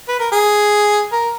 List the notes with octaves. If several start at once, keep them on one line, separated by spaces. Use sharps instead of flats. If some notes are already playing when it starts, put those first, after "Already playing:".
B4
A#4
G#4
A#4